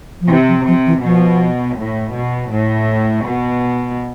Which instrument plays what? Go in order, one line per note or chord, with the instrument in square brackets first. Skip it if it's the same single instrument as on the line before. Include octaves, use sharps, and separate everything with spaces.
[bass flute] F3
[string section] C3 [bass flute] E3
[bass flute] F3
[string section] C3 [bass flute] F3
[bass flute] E3
[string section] B2 [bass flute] F3
[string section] A2
B2
A2
B2